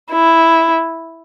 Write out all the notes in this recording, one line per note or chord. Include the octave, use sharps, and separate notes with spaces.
E4